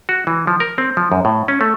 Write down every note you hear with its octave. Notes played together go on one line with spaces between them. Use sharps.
F#4
E3
F3
A#4
C4
F3
F#2
A2
C#4
A3